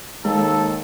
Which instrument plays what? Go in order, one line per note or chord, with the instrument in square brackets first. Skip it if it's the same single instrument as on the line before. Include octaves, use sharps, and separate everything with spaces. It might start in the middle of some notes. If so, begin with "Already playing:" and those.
[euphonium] D#2 [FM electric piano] G#3 [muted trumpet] A4